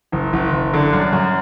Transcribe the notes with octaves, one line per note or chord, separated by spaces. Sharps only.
F#1
F#1
F#1
D3
F#2
F#2